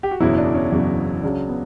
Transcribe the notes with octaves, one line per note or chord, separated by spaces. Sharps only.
G4
F#4
F#1 E2 B2 F#3 E4
D4
C#4
F#1 E2 B2 F#3
C#2 C#3 F#3 D4
B3